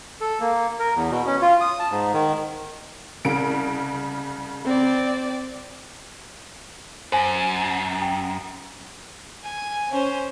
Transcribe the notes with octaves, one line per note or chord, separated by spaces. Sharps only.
A4
A#3
A#4
E2
B2
C#4
F4
D#6
A5
G#2
D#3
C2 C#3 D7
C4 D5
F#2 C5 G#5
G5
G#5
C#4 C5